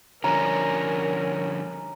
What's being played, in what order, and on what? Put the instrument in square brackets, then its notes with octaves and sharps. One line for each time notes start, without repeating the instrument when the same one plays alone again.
[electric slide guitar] D3 F3 G3 [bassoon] C#4 [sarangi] A#4 [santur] A#5